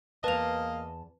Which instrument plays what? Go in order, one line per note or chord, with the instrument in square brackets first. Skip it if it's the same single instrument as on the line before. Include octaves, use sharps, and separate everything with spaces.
[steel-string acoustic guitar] E2 A5 [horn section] A#3 D#5 F5 [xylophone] B4 F7